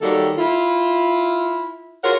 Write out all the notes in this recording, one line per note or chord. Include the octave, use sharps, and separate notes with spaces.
D#3 F#3 G3 A#3 A4
E4 F4
F4 F#4 G#4 A#4 C#5 F#5